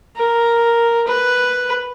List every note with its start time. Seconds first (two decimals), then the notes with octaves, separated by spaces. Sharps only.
0.16 A#4
1.07 B4